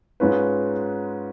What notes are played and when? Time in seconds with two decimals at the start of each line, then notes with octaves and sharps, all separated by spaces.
0.20 G#2 G#3 C#4 F4 B4